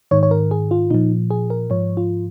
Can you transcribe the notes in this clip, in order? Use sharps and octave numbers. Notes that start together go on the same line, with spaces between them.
G#2 D#3 C#5
C#5
A#4
G#4
F4
A#2 F3 D#4
G#4
A#4
G#2 F3 C#5
F4